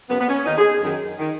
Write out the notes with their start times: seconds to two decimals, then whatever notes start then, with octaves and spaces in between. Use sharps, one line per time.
0.09 F#2 C#3 B3
0.19 B3
0.28 C#4
0.45 D#2 D#3 D#4
0.58 G#4
0.82 F#2 D#3
1.18 D#3